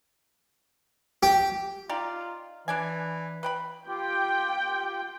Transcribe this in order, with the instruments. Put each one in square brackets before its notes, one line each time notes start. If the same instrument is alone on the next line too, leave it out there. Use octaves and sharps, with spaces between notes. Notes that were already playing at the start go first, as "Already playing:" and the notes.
[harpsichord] G4
[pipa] D#4 G4 D5 [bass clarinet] F4
[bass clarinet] E3 [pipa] D4 D5 G#5
[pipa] B4 G5 B5
[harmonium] F4 G4 [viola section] G5